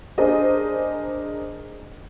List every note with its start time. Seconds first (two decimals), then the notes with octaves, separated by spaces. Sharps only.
0.18 D4 G#4 A#4 C5 D#5